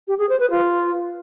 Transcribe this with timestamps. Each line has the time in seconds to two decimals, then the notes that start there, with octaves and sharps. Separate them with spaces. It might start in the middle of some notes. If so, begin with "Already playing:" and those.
0.08 G4
0.18 G#4
0.29 C5
0.40 B4
0.51 F4